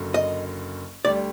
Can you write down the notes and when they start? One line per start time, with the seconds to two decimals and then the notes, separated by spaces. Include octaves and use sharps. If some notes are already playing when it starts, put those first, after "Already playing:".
Already playing: F#1 F#2 D3
0.14 D#5
1.05 D2 D3 G3 D5